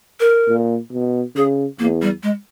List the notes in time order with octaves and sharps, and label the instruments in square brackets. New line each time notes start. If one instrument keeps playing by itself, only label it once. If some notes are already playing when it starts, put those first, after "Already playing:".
[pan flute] A#4
[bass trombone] A#2
B2
[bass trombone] C#3 [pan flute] G#4
[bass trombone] E2 [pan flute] A#3
[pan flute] G3
G#3